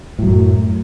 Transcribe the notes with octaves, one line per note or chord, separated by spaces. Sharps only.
F#2 A2 F#3